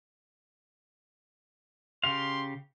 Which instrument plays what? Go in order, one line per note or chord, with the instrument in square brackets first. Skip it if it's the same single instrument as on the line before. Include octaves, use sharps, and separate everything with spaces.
[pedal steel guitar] C#3 G4 F5 [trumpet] C6